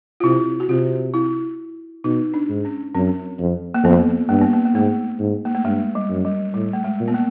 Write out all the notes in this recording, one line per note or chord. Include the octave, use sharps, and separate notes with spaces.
F4
C3 E4
F#4
C3 F4
E4
B2 D#4
D4
G#2
C#4
F#2 C4
F2
A#3
F2 B3
G2 A#3
B3
A#3
A#3
G#2 A3
G#2
A#3
A3
G2 G#3
G3
F#2
G3
A2 G3
A3
G#3
A#2
B3
A#3